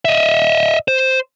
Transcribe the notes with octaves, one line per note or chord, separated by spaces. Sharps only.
D#5 E5
C5